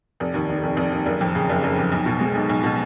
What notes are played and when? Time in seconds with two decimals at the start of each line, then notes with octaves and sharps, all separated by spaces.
0.20 F1
0.34 D#2
0.49 D#3
0.63 F1
0.77 F1
0.92 D#2
1.06 F#1
1.21 F2
1.35 C#3
1.49 F#1
1.63 F#1
1.78 F2
1.92 B1
2.06 B2
2.21 G#3
2.35 B1
2.50 B1
2.63 B2